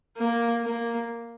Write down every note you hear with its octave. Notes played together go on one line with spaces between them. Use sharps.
A#3
A#3